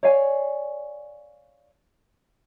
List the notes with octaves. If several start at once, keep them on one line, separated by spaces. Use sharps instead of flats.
C#5 D5 F5 G#5